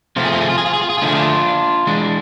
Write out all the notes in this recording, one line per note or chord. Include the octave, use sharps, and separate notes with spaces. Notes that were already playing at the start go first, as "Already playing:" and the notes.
C3 F3 A3 C4 F4
G#4
F4
G#4
F4
G#4
F4
G#4
F4
G#4
F4
D3 F3 A3 D4 G#4
D4 F4
E3 G#3 D4